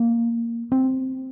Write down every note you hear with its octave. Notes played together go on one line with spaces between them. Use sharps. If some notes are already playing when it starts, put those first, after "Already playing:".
Already playing: A#3
C4